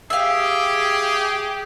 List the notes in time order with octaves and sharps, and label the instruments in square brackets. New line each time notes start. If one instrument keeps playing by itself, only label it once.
[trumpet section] G4 G#4 [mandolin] E5 F5